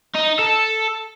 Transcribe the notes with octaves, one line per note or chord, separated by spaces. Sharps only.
D#4
A4